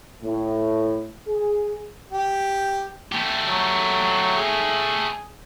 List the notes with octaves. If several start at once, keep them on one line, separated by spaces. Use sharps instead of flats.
A2
G#4
G4
A3 G4
F#3
G#4